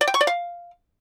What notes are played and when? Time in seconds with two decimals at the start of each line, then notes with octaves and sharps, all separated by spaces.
0.01 D5
0.08 G5
0.14 C#6
0.21 D5
0.27 F5